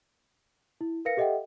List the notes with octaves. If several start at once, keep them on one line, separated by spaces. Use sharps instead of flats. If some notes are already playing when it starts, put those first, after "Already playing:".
E4
A#4 B4 F5 A#6 C#7
G4 A4 D#5 E5 F#5 G5